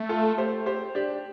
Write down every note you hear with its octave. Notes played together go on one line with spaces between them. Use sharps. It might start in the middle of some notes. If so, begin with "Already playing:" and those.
Already playing: A3
F4 A4
G4 C5
G4 C5
D4 G4